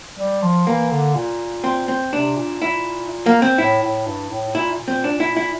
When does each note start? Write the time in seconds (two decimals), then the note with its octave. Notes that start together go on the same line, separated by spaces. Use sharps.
0.18 G3
0.42 F3
0.67 E3 A#3
0.91 D3
1.15 A#2
1.64 C4
1.88 C4
2.13 C3 D4
2.36 A#2
2.62 E4
3.26 A#3
3.42 C4
3.58 A2 E4
3.83 A2
4.07 G2
4.30 A2
4.55 A#2 E4
4.80 A#2
4.88 C4
5.04 D4
5.20 E4
5.37 E4